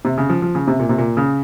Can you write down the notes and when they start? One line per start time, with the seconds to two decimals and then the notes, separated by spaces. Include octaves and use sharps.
0.05 C3
0.18 C#3
0.29 F3
0.42 F3
0.55 C#3
0.68 C3
0.80 A#2
0.89 C3
0.98 A#2
1.17 C#3